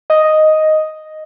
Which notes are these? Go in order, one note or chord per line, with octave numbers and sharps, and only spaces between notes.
D#5